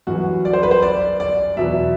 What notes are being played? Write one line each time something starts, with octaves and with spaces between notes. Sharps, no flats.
F#2 E3 G3 F#4
D5
C5
B4
C5
D5
D5
E2 B2 F#3 E5